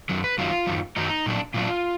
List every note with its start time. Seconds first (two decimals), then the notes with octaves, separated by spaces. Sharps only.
0.09 F#2 D#3 F#3
0.24 B4
0.38 F#2 D#3 F#3 F4
0.67 F#2 D#3 F#3
0.96 F#2 D#3 F#3 D#4
1.26 A#2 F#3 D4
1.54 A#2 F#3 D4 F4